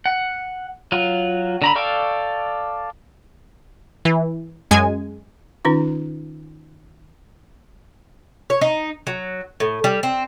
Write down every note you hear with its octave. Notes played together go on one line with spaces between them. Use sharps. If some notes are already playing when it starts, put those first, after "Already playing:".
F#5
F#3 F4
D3 A#5 B5
A4 D5 F5 G5 C#6
E3
F#2 G#3 G#5
D#3 C#4 D#4 F4
C#5
D#4
F#3
A2
G3
C4